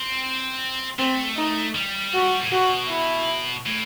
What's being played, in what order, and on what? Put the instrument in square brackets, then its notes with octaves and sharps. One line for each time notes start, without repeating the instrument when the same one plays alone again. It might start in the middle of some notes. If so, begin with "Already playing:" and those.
Already playing: [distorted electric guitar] C4
[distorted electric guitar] A3 [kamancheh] C4
[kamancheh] D#4
[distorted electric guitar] G3
[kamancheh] F#4
[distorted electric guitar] A2
[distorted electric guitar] B2 [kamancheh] F#4
[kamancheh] E4
[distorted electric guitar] A2